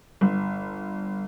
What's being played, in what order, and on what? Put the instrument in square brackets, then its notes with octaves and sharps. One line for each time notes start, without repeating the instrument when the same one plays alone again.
[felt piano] G1